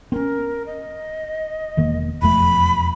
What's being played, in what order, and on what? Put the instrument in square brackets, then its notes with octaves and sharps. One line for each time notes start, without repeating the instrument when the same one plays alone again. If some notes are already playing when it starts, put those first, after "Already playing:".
[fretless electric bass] C4 C#4 [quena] A#4
[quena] D#5
[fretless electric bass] E1 D#3 A#3
[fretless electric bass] E1 F2 A3 [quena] B5